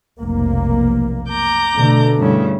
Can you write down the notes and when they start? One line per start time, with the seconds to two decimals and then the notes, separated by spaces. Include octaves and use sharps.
0.20 F1 B1 A#3
1.28 A#5 D6 G6
1.74 B2 D3 A3
2.18 G2 C#3 E4